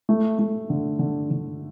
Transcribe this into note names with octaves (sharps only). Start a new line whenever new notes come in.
A3
A3
D3
D3
D3